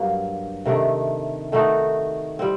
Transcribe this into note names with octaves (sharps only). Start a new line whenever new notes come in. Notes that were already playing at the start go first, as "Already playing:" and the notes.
Already playing: G2 F#3 A#3
C3 D#3 A3 D4
D#3 A3 D#4 F#4
G3 C4